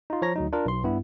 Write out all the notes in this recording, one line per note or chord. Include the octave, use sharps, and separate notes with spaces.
D#4 F4
F3 C#5 A#5 A#6
D2 F#3 D#4
D4 F4 A#4
B1 C6
G2 B3 E4